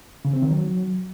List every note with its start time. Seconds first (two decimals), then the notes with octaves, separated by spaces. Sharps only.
0.25 C#3
0.33 C4
0.42 D#3
0.51 F#3